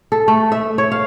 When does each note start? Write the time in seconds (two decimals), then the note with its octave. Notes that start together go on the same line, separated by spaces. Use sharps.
0.12 A4
0.28 A3
0.52 E5
0.78 C#5
0.92 F5